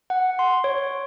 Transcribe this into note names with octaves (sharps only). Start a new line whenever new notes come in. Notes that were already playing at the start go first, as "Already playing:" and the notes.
F#5
C6
C#5